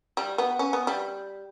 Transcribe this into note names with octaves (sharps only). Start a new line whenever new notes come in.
G3
B3
C#4
B3
G3